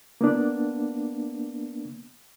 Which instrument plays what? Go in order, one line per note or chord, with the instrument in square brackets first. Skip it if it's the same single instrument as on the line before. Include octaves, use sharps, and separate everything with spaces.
[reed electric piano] A#3 B3 D4